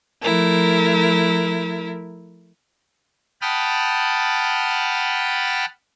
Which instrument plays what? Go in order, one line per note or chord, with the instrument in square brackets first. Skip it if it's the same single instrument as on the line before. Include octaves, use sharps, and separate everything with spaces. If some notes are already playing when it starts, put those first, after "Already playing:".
[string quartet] F3 A3 E4 A#4
[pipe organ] F#5 G5 A5 B5 D#6 F6